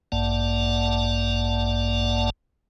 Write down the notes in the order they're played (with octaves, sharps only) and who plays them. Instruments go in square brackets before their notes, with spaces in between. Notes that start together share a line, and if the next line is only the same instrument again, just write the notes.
[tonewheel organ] A1 G2 A#3 D5 F#5 A5